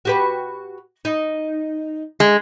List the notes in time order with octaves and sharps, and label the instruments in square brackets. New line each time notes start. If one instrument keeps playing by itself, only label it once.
[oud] F#4 G4 B4
D#4
[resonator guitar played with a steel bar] G#3